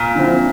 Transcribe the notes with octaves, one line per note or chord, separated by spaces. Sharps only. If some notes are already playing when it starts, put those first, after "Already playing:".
Already playing: A#2
D3 F3 C4 E4